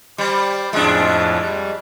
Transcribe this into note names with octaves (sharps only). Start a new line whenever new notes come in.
G3 C5 D5
F2 A2 F3 G#3 D4
G3